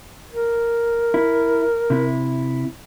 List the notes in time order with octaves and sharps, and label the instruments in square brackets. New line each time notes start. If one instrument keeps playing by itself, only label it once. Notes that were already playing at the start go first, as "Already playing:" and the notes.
[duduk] A#4
[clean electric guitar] E4
C3 E4